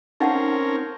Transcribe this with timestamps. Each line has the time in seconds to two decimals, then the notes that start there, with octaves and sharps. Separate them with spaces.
0.20 C4 C#4 D#4 A#4 F#5 A5